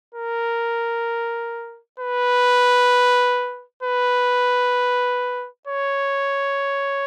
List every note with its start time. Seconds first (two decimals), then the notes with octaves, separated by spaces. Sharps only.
0.15 A#4
2.00 B4
3.83 B4
5.67 C#5